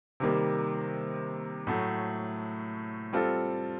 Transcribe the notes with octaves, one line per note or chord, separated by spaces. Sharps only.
C3 D#3 G3 A#3
A2 F#3 A3
G3 C4 F4 A4